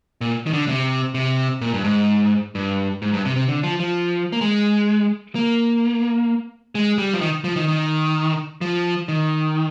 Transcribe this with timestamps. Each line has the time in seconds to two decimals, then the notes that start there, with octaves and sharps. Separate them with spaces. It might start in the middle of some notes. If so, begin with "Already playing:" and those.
0.21 A#2
0.46 D#3
0.53 D3
0.68 C3
1.14 C3
1.61 A#2
1.74 G2
1.84 G#2
2.55 G2
3.02 G#2
3.13 G2
3.25 C3
3.36 C3
3.49 D3
3.63 F3
3.80 F3
4.32 A#3
4.41 G#3
5.35 A#3
6.75 G#3
6.98 G3
7.13 F3
7.21 D#3
7.44 F3
7.56 D#3
7.68 D#3
8.61 F3
9.08 D#3